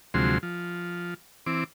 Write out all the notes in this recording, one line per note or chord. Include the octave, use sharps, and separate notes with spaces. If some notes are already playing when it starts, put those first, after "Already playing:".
D2 C3 F3 F#3 G#3 C6
F3
E3 C4 D6